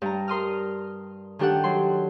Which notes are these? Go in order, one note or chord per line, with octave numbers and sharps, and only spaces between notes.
G2 A#5
A#4 C6 D#6 F6
D#3 D4 G4 A4 F#5
F#3 C6